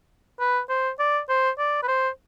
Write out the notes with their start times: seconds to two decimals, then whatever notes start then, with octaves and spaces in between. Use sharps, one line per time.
0.40 B4
0.69 C5
0.99 D5
1.29 C5
1.58 D5
1.83 B4
1.88 C5